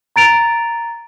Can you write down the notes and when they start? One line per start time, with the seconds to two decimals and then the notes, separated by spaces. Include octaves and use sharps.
0.16 A#5 A6 D7 F7